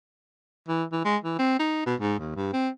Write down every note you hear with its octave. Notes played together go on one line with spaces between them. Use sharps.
E3
E3
G#3
E3
C4
D#4
B2
G#2
D#2
G2
C4